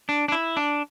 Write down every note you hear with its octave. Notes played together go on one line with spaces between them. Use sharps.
D4
D4
E4
D4